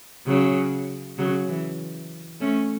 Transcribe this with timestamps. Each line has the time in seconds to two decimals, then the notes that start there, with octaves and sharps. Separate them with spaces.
0.26 C#3 F#3
1.18 C#3 F#3
1.49 E3
2.40 A3 C#4